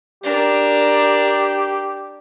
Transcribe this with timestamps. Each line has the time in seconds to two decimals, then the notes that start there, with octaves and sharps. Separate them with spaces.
0.23 D4 G4 A#4